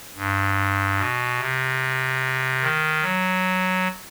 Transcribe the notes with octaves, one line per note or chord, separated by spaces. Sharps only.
G2
B2
C3
D#3
F#3